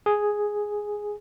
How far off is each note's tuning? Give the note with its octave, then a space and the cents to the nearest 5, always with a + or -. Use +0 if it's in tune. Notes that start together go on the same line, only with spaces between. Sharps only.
G#4 +0